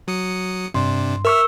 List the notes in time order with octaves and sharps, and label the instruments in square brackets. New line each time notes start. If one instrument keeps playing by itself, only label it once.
[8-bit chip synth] F#3 D#6 C#7
[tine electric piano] G2 C6 [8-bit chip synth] C3 D4
[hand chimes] A#4 C#6 E6 [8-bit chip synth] E5 F6